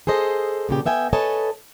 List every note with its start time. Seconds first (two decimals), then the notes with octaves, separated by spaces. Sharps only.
0.07 G#4 A4 C5 D#5
0.69 A#2 C#3 G4
0.86 B3 E5 G5 G#5
1.13 A4 B4 C#5 D#5 G#5 A5